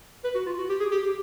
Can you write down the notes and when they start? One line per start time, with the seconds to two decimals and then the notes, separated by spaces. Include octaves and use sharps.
0.24 B4
0.35 F#4
0.46 F4
0.58 F#4
0.69 G4
0.80 G#4
0.91 G4
1.03 G4